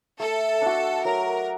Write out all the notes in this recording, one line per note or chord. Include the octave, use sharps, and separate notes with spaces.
A3 A4
D4 F#4
F#3 A#4